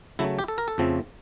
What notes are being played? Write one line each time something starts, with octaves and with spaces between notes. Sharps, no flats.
C#3 F#3 A3 E4
G4
A4
A#4
A4
F2 C#3 F3 A3 C4